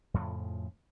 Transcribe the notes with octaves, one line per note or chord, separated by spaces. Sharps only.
F2 A2 C#3 F3